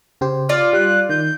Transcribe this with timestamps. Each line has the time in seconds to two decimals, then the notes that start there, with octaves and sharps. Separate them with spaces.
0.21 C#3 G4 C5
0.49 F4 D5 F6
0.73 G3 F#6
1.09 D#3 G6